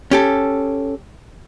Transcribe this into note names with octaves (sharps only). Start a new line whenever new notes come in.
C#4 G4 A4